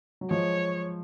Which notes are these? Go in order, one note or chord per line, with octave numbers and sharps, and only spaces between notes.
F#3
F3 G#3 C#5